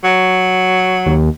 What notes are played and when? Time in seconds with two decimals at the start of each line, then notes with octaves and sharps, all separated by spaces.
0.04 F#3
1.06 D#2